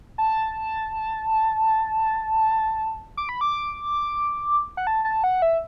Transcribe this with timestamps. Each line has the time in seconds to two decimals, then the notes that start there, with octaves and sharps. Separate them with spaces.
0.18 A5
3.17 D6
3.29 B5
3.41 D6
4.77 F#5
4.87 A5
5.05 A5
5.24 F#5
5.42 E5